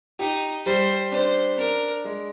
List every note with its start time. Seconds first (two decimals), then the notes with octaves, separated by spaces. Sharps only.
0.19 D#4 G4
0.66 G3 C5
1.12 D4 C5
1.58 D4 A#4
2.05 G#3